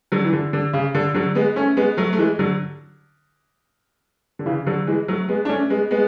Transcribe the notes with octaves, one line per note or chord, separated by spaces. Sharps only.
D3 F#3
E3
D3
D3
C#3
D3
D3 F#3
G#3 B3
A3 C#4
G#3 B3
F#3 A3
A3
E3 G#3
D3 F#3
D3
C#3 E3
D3 F#3
E3 G#3
F#3 A3
G#3 B3
D4
A3 C#4
G#3 B3
G#3 B3